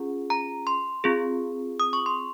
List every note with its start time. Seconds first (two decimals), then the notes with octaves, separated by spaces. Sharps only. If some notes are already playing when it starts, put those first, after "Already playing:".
Already playing: C#4 F4 G#4
0.30 A#5
0.67 C6
1.04 C4 F4 G#4
1.80 D#6
1.93 C#6
2.06 C6